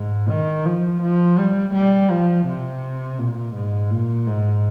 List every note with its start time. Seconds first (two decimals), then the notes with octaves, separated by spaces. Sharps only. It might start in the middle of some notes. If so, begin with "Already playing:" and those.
Already playing: G#2
0.30 D#3
0.65 F3
1.02 F3
1.38 G3
1.74 G3
2.10 F3
2.47 C3
3.19 A#2
3.55 G#2
3.91 A#2
4.27 G#2